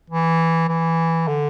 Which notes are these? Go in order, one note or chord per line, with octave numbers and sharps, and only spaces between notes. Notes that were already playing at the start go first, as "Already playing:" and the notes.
E3
E3
D3